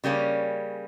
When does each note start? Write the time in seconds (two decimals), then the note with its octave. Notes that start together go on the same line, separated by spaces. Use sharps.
0.04 C#3 G3 A#3 C#4